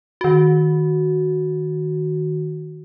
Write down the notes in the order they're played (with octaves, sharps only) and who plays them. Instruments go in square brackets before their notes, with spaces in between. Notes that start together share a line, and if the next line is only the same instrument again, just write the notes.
[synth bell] D#3 F#4